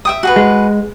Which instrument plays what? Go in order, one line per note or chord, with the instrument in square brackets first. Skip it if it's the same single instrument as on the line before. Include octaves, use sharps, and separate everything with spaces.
[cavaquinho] E5 G5 D#6
F#4 G#4 B4
[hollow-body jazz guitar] G#3